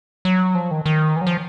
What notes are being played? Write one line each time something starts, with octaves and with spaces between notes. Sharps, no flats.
F#3
F3
D#3
D#3
E3
F#3
F3